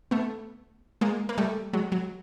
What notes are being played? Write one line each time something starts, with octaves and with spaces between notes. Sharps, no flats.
A3 B3
G#3 A#3
A#3
G3 A3
F#3 G#3
F#3